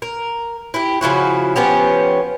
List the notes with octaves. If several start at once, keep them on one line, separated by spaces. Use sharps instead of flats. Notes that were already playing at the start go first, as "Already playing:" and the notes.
A#4
E4 G4
C#3 F3 E4 F#4
F3 B3 C#4 G4